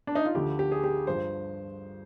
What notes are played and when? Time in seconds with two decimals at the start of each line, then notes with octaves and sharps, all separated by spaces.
0.07 D4
0.15 D#4
0.25 F4
0.34 D2 D3 F3 G4
0.59 G4
0.72 G#4
0.84 G4
1.07 G2 F3 C5